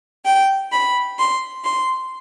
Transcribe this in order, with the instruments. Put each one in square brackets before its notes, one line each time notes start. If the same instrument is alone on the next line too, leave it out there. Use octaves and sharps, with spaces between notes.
[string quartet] G5
B5
C6
C6